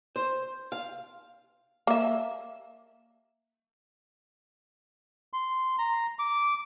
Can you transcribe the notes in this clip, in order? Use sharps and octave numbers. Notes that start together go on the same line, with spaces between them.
C5
F5
A#3 E5
C6
A#5
D6